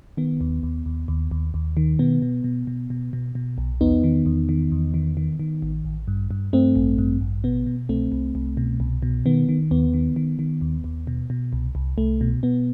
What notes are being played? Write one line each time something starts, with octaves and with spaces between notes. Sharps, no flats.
D#3 B3
D#2
D#2
D#2
D#2
D#2
D#2
D#3
B2 B3
B2
B2
B2
B2
B2
B2
B1
E2 B3 D#4
D#3
E2
D#3
E2
D#3
D#3
D#3
A1
A1
G2
G2
G2 A3 C4
A1
G2
A1
B2 B3
B2
C2 A3 C4
C2
C2
B2
C2
B2
D#3 B3
D#3
D#2 B3
D#3
D#3
D#3
D#2
D#2
B2
B2
C2
C2
C2 A3
B2
B2 B3